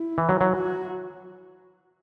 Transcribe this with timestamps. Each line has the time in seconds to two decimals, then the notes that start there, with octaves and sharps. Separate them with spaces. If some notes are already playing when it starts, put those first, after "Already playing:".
Already playing: E4
0.18 E3
0.29 F#3
0.41 F#3
0.53 F#4